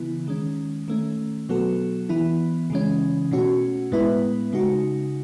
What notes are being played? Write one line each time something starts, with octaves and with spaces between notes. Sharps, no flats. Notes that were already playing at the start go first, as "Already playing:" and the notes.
Already playing: C#3 E3 B3 E4
D#3 G#3 C#4
D#3 A3 C#4
B2 F#3 B3 F#4 A4
E3 B3 E4
C#3 E3 G#3 C#4
B2 A3 C#4 F#4
A2 G#3 B3 E4 B4
C#3 G#3 D#4 F#4